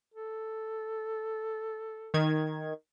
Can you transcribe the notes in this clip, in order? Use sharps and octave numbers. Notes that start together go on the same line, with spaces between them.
A4
D#3 G#6